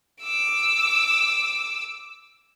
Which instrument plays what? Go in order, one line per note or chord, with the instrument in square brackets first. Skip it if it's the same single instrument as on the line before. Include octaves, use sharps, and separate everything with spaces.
[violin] D6 E6